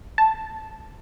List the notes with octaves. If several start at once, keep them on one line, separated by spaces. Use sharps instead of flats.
A5